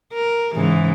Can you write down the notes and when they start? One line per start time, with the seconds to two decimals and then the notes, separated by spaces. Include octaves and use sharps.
0.13 A#4
0.55 G#2 C#3 E3